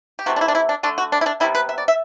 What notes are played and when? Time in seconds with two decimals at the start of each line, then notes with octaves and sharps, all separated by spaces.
0.19 G4
0.26 C3 E3 A3 F#4
0.36 D4
0.41 E4
0.48 D4
0.55 E4
0.69 D4
0.83 D3 A3 D4
0.98 F#4
1.12 D4
1.21 E4
1.26 D4
1.40 C3 E3 G3 B3 E4
1.55 B4
1.69 E5
1.78 D5
1.88 E5